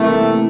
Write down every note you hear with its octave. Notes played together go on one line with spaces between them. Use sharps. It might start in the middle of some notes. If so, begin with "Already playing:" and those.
Already playing: C3 E3 G3 A3 A#3 E4